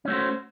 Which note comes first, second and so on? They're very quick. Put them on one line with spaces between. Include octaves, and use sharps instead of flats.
C#4 A3 F#4 C5